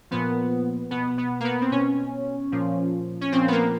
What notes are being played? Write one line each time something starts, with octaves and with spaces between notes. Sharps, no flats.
A#2 F3 B3
B2 B3
B3
A#3
B3
C4
B2 C#4
A#2 F3
C#4
A#2 F3 C4
B3
A#3